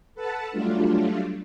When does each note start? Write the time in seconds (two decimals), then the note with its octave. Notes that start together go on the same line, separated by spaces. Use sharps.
0.15 A4 B4 F#5 A5
0.51 F#3 G3 A3 D4 F4